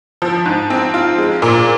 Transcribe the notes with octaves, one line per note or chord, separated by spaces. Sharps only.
F3
G#2
C4
F4
G#3
A#2